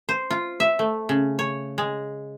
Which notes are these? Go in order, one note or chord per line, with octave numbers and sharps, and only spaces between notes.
C5
F4
E5
A3
C#3
C#5
G#3